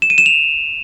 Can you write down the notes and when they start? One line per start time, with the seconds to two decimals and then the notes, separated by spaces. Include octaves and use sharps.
0.02 E7
0.10 D#7
0.18 E7
0.26 F7